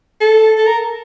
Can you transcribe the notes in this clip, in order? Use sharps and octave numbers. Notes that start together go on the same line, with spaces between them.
A4
A4
A#4